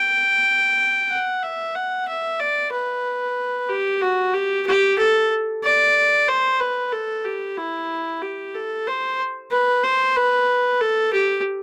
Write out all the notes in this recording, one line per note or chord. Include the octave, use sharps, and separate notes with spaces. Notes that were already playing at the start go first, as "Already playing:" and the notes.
Already playing: G5
F#5
E5
F#5
E5
D5
B4
G4
F#4
G4
G4
A4
D5
C5
B4
A4
G4
E4
G4
A4
C5
B4
C5
B4
A4
G4